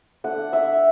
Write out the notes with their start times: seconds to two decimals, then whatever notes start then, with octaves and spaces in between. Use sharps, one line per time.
0.24 A3 D4 F#5
0.53 E5